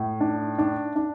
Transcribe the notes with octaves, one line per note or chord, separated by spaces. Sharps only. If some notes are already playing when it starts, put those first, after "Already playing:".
Already playing: A2
D4
D4
D4